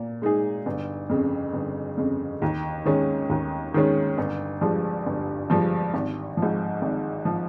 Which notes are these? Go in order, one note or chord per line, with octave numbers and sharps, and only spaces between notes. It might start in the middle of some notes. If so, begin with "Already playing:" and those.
Already playing: A#2
G#3 D#4 G#4
G1
F2 C#3
G1
F2 C#3
D#2
D#3 G#3 C#4
D#2
D#3 G#3 C#4
G1
G2 F3 G#3
G1
G2 F3 G#3
G#1
F3
G#2
G#1
F3